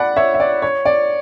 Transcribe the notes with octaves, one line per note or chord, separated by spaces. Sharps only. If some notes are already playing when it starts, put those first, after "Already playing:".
Already playing: D5 F#5 B5
C#5 E5
E5
D5
C#5
D5